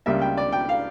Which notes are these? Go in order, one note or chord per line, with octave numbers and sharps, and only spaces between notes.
C#2 C#3 G3 A#3 E5
G5
D5
G5
F5